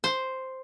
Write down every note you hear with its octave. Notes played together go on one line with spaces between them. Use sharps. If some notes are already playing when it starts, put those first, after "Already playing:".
C5